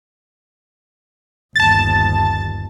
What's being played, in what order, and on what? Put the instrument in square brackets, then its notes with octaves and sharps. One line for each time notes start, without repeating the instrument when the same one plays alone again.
[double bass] G1 D#2 [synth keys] A5 A6